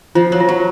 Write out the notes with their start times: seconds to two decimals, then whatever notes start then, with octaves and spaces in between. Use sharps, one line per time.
0.15 F3 F4
0.32 F#3
0.41 F4
0.49 F#3